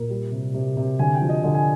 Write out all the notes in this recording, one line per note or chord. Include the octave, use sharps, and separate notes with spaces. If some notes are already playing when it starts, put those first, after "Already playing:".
Already playing: A#2 A#4
G3
C3
C3
C3
D3 G#5
G5
F3
D#5
D3 D#5
G#5